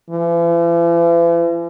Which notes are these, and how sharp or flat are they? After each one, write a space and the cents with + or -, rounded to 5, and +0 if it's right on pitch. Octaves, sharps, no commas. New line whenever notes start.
E3 +45